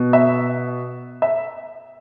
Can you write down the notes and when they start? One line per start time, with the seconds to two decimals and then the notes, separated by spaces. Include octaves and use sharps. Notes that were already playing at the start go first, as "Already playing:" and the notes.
Already playing: B2
0.13 E5
1.22 E5